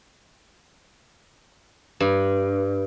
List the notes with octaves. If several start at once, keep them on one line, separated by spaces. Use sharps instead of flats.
G2